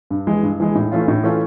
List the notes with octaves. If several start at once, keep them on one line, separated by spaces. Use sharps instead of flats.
G2
E3 G#3
G2
E3 G#3
A2
E3 A3 C#4 F4
A2
E3 A3 C#4 F4